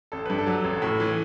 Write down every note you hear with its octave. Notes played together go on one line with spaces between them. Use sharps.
A1 A4
G2 B4
A4
F#3
A1
A2
E3